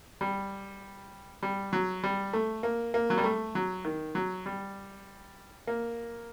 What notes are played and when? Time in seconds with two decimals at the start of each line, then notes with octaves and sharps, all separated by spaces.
0.21 G3
1.43 G3
1.73 F#3
2.04 G3
2.33 A3
2.63 A#3
2.94 A#3
3.10 F#3
3.18 G3
3.24 A3
3.55 F#3
3.85 D#3
4.15 F#3
4.46 G3
5.67 A#3